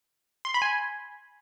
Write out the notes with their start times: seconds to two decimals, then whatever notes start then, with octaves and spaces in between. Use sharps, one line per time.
0.45 C6
0.54 B5
0.62 G#5